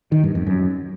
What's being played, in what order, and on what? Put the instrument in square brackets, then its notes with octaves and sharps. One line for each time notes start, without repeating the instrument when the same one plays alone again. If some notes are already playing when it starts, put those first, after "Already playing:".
[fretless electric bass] D#3
G2
F2
F#2